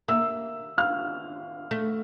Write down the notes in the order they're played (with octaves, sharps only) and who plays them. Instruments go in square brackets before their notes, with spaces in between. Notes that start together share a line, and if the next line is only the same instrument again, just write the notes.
[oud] A#3 [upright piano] E5 E6
[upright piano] F5 F6
[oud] A3